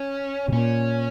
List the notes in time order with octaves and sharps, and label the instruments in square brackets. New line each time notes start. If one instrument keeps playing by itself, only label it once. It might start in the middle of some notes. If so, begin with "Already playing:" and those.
Already playing: [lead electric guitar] C#4
[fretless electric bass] C3
[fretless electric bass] A#2 [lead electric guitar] C#4